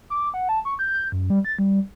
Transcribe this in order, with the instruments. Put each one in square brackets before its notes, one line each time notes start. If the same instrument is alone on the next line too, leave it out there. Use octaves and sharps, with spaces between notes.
[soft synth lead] D6
F#5
A5
C#6
G6
G6
F#2
G3
A6
G3